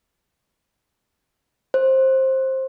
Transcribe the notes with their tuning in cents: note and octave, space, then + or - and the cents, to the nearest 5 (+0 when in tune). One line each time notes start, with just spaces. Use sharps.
C5 +15